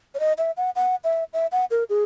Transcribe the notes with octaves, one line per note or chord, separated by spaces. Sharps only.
C#5
D#5
E5
F#5
F#5
E5
E5
F#5
A#4
G#4